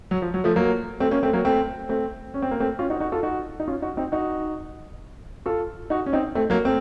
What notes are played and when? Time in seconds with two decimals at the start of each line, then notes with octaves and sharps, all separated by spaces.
0.11 F#3
0.22 F3
0.34 F#3
0.44 F3 A3
0.56 F#3 A#3
1.00 A3 C4
1.11 A#3 C#4
1.23 A3 C4
1.33 F#3 A#3
1.45 A3 C4
1.89 A3 C4
2.34 C#4
2.42 C4
2.51 A#3
2.60 A3 C4
2.79 C#4 F4
2.90 D#4 F#4
3.00 D#4 F#4
3.12 F4 A4
3.23 D#4 F#4
3.60 D#4
3.68 C#4 F4
3.82 D#4 F#4
3.97 C4 D#4
4.12 D#4 F#4
5.46 F4 A4
5.90 D#4 F#4
6.06 C#4
6.13 C4 D#4
6.35 A3 C4
6.50 F#3 A#3
6.65 A3 C4